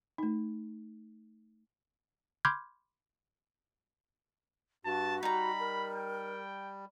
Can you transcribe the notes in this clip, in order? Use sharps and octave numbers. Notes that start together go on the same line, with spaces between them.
A3 D#4
B5 C6 D6 F6 G6 G#6
G2 F#4 A5
G3 D#4 A#5 B5
A#4
G5